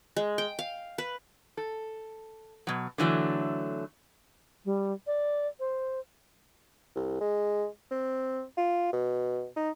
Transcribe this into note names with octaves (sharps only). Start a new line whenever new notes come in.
G#3
G5
F5
B4
A4
B2 F#3
D3 E3 F#3 A3
G3
D5
C5
C2
G#3
C4
F4
B2
D#4